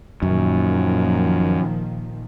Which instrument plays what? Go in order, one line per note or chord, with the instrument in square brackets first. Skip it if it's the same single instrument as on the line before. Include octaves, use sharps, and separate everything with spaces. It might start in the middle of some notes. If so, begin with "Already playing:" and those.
[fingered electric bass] F#2 [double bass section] A#2 D#3 F3